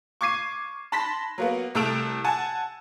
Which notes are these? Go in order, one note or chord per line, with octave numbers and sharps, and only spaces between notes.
C#6 D6 G#6 C7 D#7
A5 B5 C6 A#6 B6
F#3 A#3 B3
C2 A3 A4 E6 D7 F7
F#5 G#5 A5